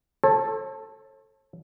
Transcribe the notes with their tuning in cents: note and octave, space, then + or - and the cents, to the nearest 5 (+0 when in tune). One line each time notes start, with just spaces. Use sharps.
A4 +0 C#5 -45